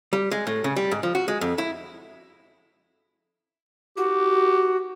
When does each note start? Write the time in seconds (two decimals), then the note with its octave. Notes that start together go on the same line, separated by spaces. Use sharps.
0.13 G3
0.31 G#3
0.47 A2
0.64 C#3
0.76 G3
0.91 G#2
1.03 F3
1.15 F#4
1.28 G#3
1.41 F2
1.58 E4
3.97 F#4 G4